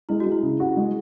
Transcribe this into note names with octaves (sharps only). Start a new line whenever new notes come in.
G#3 E4
F#4
G#3
E4
C#3
F#4
G#3